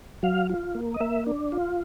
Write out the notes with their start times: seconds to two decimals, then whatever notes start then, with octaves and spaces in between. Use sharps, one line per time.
0.23 F#3 F5
0.49 F4
0.75 A#3
0.94 D#5
1.00 A#3 E5
1.26 D4
1.52 F4